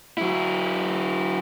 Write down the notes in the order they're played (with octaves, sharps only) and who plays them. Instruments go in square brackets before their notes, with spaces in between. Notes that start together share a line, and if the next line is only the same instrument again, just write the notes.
[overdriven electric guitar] F#3 E4